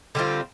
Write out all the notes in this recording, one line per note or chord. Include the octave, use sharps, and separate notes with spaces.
D3 G3 C4 F4